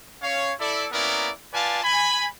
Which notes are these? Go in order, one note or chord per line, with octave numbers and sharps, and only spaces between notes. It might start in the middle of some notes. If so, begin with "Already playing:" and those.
C#4 C#5 F5
E4 A4 D5
A#3 B3 C#4 E4 A#4 D5
F4 B4 D5 F5 G#5 A5
G#5 B5